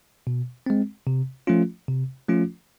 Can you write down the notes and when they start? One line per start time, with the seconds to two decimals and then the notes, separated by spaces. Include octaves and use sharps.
0.27 B2
0.66 G#3 C4
1.07 C3
1.47 F3 A3 C#4 F4
1.88 C3
2.29 F3 A3 C#4 F4